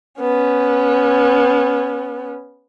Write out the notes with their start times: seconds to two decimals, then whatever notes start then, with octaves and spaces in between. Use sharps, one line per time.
0.21 B3 C#4